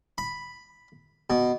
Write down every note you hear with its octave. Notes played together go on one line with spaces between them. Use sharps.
B5
B2